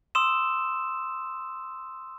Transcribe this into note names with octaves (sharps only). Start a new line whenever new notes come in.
C6 D#6 E6 E7